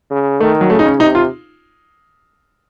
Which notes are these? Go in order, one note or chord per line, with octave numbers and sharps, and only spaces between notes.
C#3
D#3 A3
F#3
C#3 A3
D#4
C#4
C3 D#4
F4